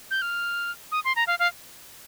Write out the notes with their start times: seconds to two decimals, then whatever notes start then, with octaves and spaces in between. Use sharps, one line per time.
0.11 G6
0.22 F6
0.92 D#6
1.05 C6
1.16 A#5
1.27 F5
1.39 F5